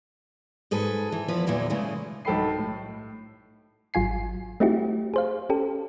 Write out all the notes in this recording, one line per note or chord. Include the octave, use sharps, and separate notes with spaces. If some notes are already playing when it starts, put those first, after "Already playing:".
G#2 G#4 A4 B4
E3
E2 F3 E4 B4
E2 A#2 D3 E3 F#3
C#3 E3 G#3 A3
B1 G2 A4 G5 B5 C7
A2
G#1 F#3 F4 G#5 C7
A3 C4 D#4 E4 F#4 G4
G#4 C5 F5
C#4 G4 A4